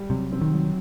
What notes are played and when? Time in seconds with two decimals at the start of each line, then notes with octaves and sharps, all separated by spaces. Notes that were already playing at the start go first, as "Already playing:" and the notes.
Already playing: G3
0.10 C3 F#3
0.32 C4
0.42 D#3
0.53 F#3